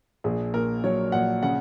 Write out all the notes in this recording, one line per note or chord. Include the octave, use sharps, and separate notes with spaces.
A#1 G#4
A#2 A#4
F#3 C#5
A#1 F#5
C#3 F#5